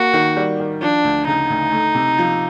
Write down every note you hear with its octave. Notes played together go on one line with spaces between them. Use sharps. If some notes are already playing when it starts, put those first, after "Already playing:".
Already playing: A#3 F#4
D#3
G3
D#3
F3 D4
D2
C#3 D#4
D2
A3
C3
F3